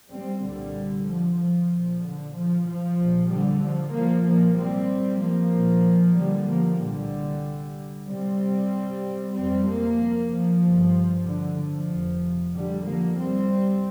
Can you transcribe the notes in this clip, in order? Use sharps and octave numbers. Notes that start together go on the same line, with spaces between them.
G3 C4
C2 A#2 D3 G3
F3
F3
A#1 A#2
D3
F3
F3
A#1 A#2
D3 G3
F3
F3 A#3
C2 A#2 F3 A#3
G3 C4
F3 A#3
A#1 A#2
D3 G3
F3 A#3
C2 A#2 D3 G3
C2 C3 G3 C4
F1 F2 C3 G3 C4
F3 A#3
F3
G1 G2
D3
F3
F1 F2 C3
D3 G3
F3 A#3
C2 C3 G3 C4